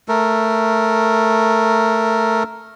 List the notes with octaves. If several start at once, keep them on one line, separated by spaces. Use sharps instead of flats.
A3 A#4